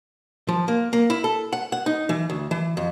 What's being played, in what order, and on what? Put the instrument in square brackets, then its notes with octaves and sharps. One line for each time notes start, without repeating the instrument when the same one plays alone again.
[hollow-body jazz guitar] F3
A#3
A#3
E4
A4
F#5
F#5
D#4
E3
D2
E3
F2